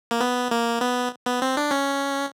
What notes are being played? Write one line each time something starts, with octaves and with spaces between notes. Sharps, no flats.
A#3
B3
A#3
B3
B3
C4
D4
C#4